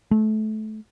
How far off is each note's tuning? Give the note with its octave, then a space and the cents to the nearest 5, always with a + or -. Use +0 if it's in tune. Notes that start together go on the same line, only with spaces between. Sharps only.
A3 -25